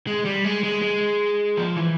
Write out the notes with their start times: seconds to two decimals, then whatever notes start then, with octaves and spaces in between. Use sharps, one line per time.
0.07 G#3
0.25 G3
0.44 G#3
0.64 G#3
0.82 G#3
1.57 F3
1.77 E3